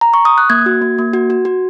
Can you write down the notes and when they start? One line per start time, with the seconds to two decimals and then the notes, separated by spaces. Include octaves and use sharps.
0.01 A#5
0.14 C#6
0.25 D#6
0.38 F#6
0.50 A#3 G#6
0.66 F#4
0.82 A#3
0.98 A#3
1.13 F#4
1.30 F#4
1.45 F#4